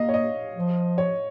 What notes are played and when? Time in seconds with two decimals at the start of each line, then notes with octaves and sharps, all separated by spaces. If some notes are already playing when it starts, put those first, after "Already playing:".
Already playing: A#3 D#5 F5
0.09 C#5
0.14 D#5
0.55 F3
0.98 C#5